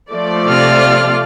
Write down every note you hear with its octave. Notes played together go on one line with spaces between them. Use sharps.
F3 A3 D5
C3 F4 F6